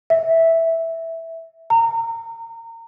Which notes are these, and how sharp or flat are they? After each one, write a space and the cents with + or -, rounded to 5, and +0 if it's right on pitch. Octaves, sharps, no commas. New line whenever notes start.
E5 -5
A#5 -25